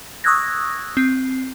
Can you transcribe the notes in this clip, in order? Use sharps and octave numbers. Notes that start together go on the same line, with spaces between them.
C#6 D#6 E6 F#6 G#6 A#6
C4